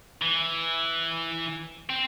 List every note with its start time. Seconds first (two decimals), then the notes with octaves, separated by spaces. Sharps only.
0.22 E3
1.90 C4